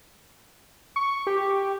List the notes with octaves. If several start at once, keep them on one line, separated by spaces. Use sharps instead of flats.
C#6
G4